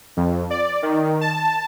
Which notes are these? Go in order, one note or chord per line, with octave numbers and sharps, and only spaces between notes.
F2
D5
D#3
A5